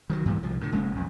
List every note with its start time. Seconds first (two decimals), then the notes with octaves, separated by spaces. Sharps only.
0.10 D#3 F3 F#3
0.25 G2 A#2 E3 G3
0.43 C2 F3
0.61 A2 D3
0.72 F1 G#3 A#3 C#4
0.95 B1 F2